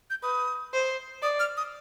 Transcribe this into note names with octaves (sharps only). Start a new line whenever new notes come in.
G6
B4 D#6
C5
D5 D#6
F6
D#6